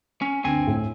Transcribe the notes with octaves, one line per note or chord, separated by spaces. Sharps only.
C#4
D2 G2 C4 G#5
A2